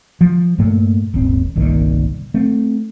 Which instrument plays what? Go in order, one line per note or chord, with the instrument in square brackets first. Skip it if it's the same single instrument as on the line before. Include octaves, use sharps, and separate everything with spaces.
[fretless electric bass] F3
G2 A#2 A3 A#3
D#1 G#1 C4
G1 C2 A#2 D#3
A3 C4